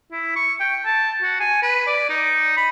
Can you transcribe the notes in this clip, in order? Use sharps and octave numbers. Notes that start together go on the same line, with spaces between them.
E4
C#6
G5
A5
F#4
G#5
B4
D5
D#4
B5